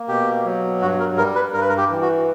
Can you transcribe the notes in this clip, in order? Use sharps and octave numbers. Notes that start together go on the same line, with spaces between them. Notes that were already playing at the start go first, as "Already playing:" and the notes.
Already playing: A#3
B2 G4
F#3
G2 F#4
A#4
G3 A#4
B4
G2 A#4
B4
A#4
G4
E3
F#4